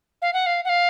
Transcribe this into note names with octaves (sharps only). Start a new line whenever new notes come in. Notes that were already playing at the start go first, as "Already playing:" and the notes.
F5
F#5
F5
F#5
F5